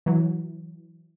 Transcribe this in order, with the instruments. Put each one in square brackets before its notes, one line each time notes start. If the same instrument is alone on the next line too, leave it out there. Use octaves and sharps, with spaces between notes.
[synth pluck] E3 F#3